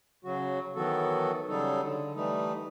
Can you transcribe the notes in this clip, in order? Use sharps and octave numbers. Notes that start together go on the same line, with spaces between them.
C#3 F#3 F#4
D#3 E3 F#3 B3 F#4 A4
C#3 F#3 G3 D#4 A4
D3
E3 G3 A3 D#4